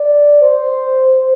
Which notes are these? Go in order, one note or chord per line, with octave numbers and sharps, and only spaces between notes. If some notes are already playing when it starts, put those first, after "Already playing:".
Already playing: D5
C5